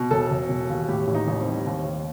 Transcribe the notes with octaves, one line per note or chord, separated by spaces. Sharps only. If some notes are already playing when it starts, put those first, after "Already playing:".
Already playing: B2
E1 A4
E1
E1
D#2
A2 G4
A1
D#4
A1
C4
G3
D#2
D#2